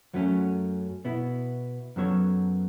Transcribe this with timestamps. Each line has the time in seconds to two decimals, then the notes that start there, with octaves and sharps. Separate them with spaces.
0.14 F#2 F#3 A3 C#4
1.04 B2 B3 E4
1.96 F#2 F#3 B3 A4 C#5